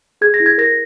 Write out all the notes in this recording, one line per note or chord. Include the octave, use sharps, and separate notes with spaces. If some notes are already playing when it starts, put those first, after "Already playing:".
G#4 G#6
A#6
E4
G#6
A#4 A#6